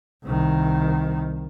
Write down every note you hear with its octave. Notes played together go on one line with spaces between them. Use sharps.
C2 D#3